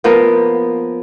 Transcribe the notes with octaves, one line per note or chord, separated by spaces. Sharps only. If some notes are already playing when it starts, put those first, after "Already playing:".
F3 A#3 B3